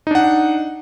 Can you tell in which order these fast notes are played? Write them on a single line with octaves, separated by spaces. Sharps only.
D#4 D4 F#5